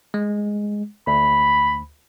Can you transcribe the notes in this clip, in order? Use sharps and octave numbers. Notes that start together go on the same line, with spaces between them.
G#3
D2 B5